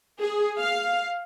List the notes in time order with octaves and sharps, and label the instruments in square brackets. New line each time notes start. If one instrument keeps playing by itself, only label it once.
[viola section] G#4
F5